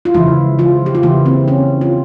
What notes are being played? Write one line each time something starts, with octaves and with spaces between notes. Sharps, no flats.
F4
C#3 E3 F3 G#3 E4
F3 F4
G4
F4
C#3 E3 A#3 E4
C4
C#4
F4